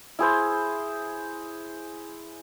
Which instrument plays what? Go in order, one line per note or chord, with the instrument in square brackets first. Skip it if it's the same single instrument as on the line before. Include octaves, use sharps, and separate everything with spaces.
[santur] E4 G#4 C5